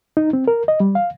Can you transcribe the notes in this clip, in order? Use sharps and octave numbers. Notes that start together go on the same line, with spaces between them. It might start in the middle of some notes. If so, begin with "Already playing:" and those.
D#4
C4
A#4
D#5
G3
F5